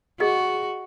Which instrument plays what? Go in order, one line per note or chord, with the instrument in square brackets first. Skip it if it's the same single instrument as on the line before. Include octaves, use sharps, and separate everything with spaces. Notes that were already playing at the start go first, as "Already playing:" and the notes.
[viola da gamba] F#4 [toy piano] G#4 D#5